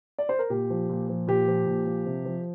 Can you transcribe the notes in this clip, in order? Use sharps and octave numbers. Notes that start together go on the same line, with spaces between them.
D5
C5
A#4
A#2 G4
F3
A#2
F3
A#2 G4
F3
A#2
F3
C3
F3